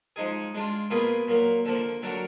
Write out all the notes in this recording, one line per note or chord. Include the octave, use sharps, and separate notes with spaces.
F3 G#3 D#4 G#4
G#3 D4 F4
B2 A#3 F4 G#4 B4
A#2 F#3 A#3
D3 F3 A#3
D3 F#3 D4 F#4 A#4